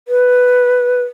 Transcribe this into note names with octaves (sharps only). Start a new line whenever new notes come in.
B4